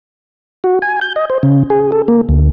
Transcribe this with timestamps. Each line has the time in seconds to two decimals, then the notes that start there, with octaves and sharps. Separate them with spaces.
0.64 F#4
0.82 G#5
1.01 G6
1.16 D#5
1.30 C5
1.43 C#3
1.70 G#4
1.92 A4
2.08 A#3
2.29 D2